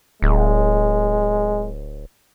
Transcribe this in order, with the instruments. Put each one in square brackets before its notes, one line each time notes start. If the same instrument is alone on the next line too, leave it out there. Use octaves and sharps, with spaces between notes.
[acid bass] D1 [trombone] G#3